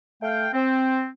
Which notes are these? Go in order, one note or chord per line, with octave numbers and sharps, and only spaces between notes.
A3 F5 G5
C4